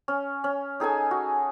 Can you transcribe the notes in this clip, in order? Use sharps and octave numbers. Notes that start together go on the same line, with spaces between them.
C#4
C#4
D#4 G#4 A4 G#5
F#4